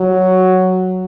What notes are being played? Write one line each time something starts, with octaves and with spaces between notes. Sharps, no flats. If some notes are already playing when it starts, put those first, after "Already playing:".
Already playing: F#3